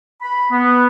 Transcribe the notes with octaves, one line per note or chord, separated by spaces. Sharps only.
B5
B3